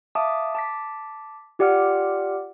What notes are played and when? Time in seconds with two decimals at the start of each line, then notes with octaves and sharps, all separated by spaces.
0.15 E5 F5 A5 D6 D#6
0.55 A5 D6 B6
1.59 F4 G4 D5 F#5 D6 F6